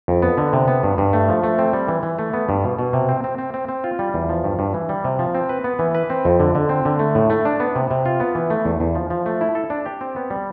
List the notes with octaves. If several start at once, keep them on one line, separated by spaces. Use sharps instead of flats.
F2
B3
D3
C3
B3
G2
G2
A3
F3
A3
C4
G3
E3
E3
A3
B3
G2
B2
B2
C3
C4
C4
C4
C4
C4
F4
G3
E2
F3
G2
G2
E3
G3
C3
F3
C4
B4
B3
E3
B4
C4
F2
D3
D3
C4
D3
A3
A2
A3
D4
B3
C3
C3
F4
B3
E3
A3
E2
E2
F3
F3
A3
E4
A4
D4
G4
C4
B3
G3